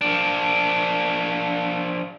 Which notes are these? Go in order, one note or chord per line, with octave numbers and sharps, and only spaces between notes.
F3 D4